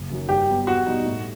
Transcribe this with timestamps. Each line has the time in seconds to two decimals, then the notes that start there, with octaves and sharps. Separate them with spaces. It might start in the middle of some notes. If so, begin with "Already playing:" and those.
Already playing: F#1
0.10 F#2 D#3 F#3
0.29 G2 G4
0.48 F#3 B3
0.67 E2 F#4
0.86 B2 G3 D#4
1.05 A2